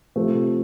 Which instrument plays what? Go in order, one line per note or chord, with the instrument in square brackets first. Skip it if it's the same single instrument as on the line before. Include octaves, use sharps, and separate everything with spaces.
[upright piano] C3 F3 A3 C4